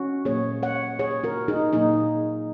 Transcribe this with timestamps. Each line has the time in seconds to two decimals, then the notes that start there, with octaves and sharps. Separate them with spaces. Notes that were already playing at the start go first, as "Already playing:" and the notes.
Already playing: C#4 F#4
0.25 A#2 F#3 A#3 G#4 C#5
0.63 C#5 F#5
0.99 G#4 C#5
1.24 F#4 A#4
1.48 D#4 G#4
1.73 A#2 F#3 A#3 D#4 G#4